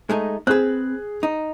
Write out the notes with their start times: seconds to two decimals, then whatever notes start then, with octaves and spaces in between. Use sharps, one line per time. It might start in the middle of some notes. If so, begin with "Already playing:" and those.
0.10 G#3 A3 D#4
0.47 C4 G#4 B4 F#6
1.23 D#4